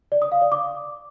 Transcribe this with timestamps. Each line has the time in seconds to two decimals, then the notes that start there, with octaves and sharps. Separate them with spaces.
0.12 D5
0.22 D#6
0.32 F5
0.42 D5
0.52 D6